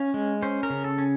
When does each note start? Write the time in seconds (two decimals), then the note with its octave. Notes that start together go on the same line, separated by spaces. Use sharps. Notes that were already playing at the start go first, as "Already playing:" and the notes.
Already playing: C#4 F5
0.14 G#3
0.42 C#4 C5
0.63 A#4
0.70 C#3
0.84 A4
0.98 C#4